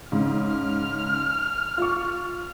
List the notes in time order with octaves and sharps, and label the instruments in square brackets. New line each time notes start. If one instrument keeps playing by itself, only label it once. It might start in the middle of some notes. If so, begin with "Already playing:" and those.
[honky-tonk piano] G#2 C#3 [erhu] F6
[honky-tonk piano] F4 C#6